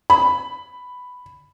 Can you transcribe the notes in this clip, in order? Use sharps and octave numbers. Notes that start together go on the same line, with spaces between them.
B5